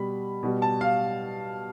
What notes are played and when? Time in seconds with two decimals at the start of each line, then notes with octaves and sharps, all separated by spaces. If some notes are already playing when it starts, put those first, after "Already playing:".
Already playing: B2 G3 B5
0.43 B2 G3
0.62 A5
0.81 F5